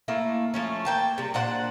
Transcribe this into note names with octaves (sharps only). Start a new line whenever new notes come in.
A3 A#3 E4
F3 A3 C#4
A#3 G5 A5
C3 G3
A#2 D4 C5 F#5